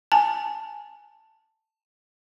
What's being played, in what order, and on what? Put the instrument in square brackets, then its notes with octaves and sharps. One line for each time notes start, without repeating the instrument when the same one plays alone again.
[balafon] G#5 A5